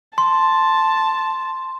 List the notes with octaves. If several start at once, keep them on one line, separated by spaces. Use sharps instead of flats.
A5 C6